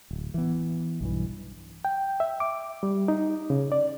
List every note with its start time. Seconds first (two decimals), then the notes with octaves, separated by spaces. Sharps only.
0.11 D1
0.34 E3 B3
1.01 B1 G2 E3
1.85 G5
2.20 E5
2.40 D6
2.83 G3
3.08 D#4
3.50 C#3
3.72 D5